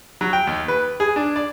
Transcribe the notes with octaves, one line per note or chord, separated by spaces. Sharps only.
F#3
G5
D#2
B4
G#4
D4
D5